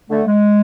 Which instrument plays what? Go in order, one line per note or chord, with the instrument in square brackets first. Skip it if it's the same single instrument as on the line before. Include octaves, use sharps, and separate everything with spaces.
[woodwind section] D3 A3
G#3